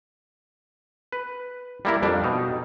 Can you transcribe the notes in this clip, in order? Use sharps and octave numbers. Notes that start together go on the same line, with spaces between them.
B4
G3 A#3 E4 A#4
F2 G3 D4
B2 D#4